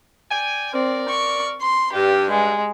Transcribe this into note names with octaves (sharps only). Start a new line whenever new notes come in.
D5 G5 G#5
C4 A#4 D5
C#6
C6
G2 G4
G#3